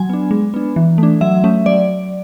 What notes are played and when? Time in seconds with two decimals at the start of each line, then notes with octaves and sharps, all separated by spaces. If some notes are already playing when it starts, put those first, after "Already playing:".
Already playing: F#3 G#5
0.09 B3 D4
0.31 G#3
0.54 B3 D4
0.76 E3
0.98 A3
1.03 D4
1.21 F#3 E5
1.44 A3 C#4
1.66 F#3 D5